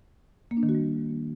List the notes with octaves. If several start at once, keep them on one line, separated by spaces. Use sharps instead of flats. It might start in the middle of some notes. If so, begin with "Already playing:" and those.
A#3
D4
D#3
F#4
G3